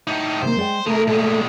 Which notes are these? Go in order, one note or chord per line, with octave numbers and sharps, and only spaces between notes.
A2 D#4
C3 D#3 A#3 C5
G#3 D5 G5
C3 G#3 A3 A4 A#4
A#2 G#3